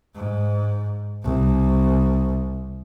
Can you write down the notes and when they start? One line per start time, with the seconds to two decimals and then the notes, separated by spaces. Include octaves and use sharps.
0.15 G#2
1.23 C2